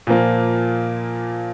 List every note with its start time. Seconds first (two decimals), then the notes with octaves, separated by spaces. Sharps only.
0.07 A#2 F3 A#3